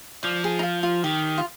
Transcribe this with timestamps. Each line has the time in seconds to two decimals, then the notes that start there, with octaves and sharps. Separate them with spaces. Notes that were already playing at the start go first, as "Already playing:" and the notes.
0.23 F3 D5
0.44 G#4
0.59 D#4
0.63 F4
0.83 F4
1.04 D#3 G4
1.38 F4